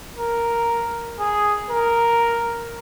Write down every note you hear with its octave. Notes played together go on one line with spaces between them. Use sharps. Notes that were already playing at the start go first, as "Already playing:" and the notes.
A#4
G#4
A#4